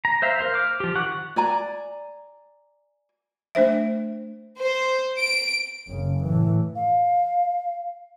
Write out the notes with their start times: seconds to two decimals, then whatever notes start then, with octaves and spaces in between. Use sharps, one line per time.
0.05 A#5
0.22 C5 E5 F5
0.39 A#4 C5 F5
0.54 D6 F6
0.80 F3 G4
0.95 D#3 F#5 C#6 F#6
1.36 D5 G#5 A#5
3.55 A3 D4 C5 E5
4.58 C5
5.17 D7
5.88 F#1 C#3
6.24 A2 E3
6.75 F5